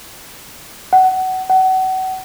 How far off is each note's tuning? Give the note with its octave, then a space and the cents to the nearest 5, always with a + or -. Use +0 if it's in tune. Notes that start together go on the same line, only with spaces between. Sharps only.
F#5 +20
F#5 +30